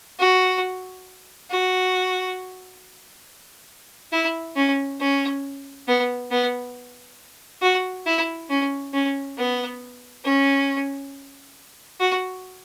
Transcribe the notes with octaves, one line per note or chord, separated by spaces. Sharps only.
F#4
F#4
E4
C#4
C#4
B3
B3
F#4
E4
C#4
C#4
B3
C#4
F#4